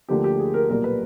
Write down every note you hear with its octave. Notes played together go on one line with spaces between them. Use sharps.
D2 D3 F3 A#3 G4
G4
G#4
A#4
B1 A#2 G3 A#3 A#4
B4